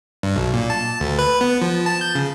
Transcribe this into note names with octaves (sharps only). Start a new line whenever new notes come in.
G2
B1
A#2
A5
D2
B4
B3
F3
A5
G6
C#3